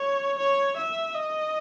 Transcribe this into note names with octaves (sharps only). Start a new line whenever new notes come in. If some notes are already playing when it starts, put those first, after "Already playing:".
Already playing: C#5
C#5
E5
D#5